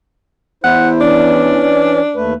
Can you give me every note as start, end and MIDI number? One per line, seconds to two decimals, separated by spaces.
0.64 1.74 40
0.64 1.01 64
0.64 1.01 72
0.64 0.89 78
1.01 2.00 52
1.01 2.00 61
1.01 2.29 62
1.01 2.00 74
2.16 2.33 39
2.16 2.33 57
2.16 2.33 71